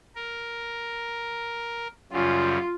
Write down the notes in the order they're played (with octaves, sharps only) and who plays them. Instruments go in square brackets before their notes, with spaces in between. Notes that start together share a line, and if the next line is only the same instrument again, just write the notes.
[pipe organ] A#4
[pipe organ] F#2 C#3 G3 [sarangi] F4